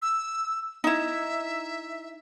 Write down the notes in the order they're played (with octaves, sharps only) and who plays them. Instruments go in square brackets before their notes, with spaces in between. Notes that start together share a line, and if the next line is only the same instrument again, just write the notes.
[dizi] E6
[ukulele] D#4 E4 [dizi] E5